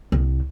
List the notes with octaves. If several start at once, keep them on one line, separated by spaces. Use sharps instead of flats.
C2